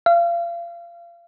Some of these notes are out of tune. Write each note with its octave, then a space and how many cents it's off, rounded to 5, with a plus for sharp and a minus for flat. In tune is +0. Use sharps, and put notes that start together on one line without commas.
F5 -30